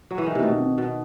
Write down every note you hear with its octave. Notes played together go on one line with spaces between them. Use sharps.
F#3
E3
D#3
C3 B3
B2 A3
D#4
C4
B2 D#4